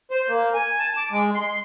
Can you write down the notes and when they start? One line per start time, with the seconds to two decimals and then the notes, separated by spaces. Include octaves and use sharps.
0.11 C5
0.29 A#3
0.54 G#5
0.79 A5
0.97 D6
1.12 G#3
1.34 C6